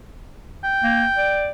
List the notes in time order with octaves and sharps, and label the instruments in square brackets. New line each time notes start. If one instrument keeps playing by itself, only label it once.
[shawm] G5
[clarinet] A#3
D5